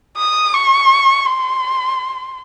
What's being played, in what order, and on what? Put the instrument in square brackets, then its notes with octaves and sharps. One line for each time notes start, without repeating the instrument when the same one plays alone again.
[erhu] D#6
C#6
C6